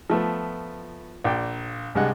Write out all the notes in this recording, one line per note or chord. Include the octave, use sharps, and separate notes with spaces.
F3 A3 B3
A#1 D5 G5
C2 G2 G#3 F#5